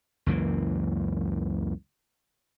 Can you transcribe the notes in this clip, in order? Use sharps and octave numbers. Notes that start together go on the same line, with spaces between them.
C#2 F#2 E3 A#3